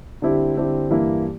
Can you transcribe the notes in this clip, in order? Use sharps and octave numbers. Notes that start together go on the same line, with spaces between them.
D3 G3 C4 E4 G4
D3 G3 C4 E4 G4
G2 E3 A#3 E4